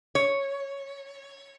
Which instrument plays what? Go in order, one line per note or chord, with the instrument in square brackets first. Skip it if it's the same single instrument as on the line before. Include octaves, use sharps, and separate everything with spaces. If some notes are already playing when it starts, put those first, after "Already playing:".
[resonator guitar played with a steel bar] C#5